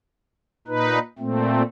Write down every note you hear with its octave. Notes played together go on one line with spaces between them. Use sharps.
A#2 D#4 B4
A#2 A3 C4